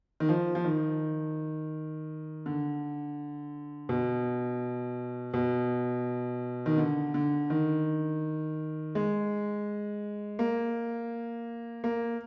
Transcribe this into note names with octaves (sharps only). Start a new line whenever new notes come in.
D#3
F3
F3
D#3
D3
B2
B2
D#3
D3
D3
D#3
G#3
A#3
A#3